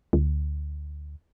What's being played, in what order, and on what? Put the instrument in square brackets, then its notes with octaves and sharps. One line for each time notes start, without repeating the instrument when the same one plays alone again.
[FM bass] D2